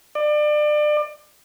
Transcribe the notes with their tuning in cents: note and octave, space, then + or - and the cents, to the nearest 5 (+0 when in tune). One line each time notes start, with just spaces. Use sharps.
D5 +30